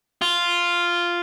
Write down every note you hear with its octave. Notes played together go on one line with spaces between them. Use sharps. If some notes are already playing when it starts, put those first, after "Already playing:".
F4